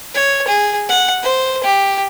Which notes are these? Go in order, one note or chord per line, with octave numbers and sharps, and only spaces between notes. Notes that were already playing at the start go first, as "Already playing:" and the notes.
C#5
G#4
F#5
C5
G4